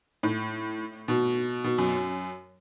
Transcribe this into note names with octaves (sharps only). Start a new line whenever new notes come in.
A2
B2
B2
F#2